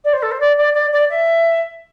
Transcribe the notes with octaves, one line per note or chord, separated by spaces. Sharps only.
D5
C5
A4
C5
D5
D5
D5
D5
E5